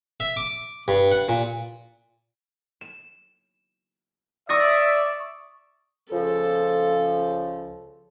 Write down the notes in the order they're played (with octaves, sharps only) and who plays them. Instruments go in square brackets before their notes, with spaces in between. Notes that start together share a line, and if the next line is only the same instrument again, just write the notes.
[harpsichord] E5
D6
G2
F#5
A#2
[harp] E7
[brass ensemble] D5 E5 [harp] C#6 D#6 A#6
[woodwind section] C#2 C#3 F3 [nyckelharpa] A4